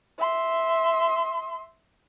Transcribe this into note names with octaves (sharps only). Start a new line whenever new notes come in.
E5 C6